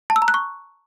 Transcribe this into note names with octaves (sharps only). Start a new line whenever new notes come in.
A5
E6
A#5
F#6
C#6